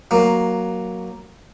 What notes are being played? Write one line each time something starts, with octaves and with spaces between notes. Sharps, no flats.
F#3 A#3